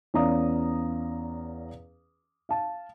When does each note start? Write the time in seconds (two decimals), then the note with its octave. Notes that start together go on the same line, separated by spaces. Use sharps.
0.14 E2 C#4 D5 F5 A#5 D#6
2.49 F5 A5